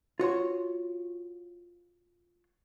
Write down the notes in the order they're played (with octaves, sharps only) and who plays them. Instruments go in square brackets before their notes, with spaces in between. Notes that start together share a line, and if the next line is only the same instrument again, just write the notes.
[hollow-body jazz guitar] F4 F#4 C#5 C6